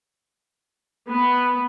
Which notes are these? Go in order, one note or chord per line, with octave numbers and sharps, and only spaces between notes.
B3